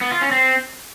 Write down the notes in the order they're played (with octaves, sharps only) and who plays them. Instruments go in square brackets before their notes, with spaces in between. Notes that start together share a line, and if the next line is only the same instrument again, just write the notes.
[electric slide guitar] B3
F4
C#4
C4